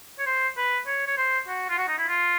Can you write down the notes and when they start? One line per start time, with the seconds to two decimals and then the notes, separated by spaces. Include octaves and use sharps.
0.19 C#5
0.26 C5
0.57 B4
0.87 C#5
1.07 C#5
1.17 C5
1.48 F#4
1.70 F4
1.78 F#4
1.88 D#4
1.98 E4
2.08 F4